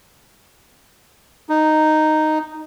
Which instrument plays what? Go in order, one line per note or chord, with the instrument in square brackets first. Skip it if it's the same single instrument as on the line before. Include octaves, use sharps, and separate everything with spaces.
[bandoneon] D#4